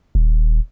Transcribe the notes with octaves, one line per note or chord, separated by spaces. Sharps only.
D#1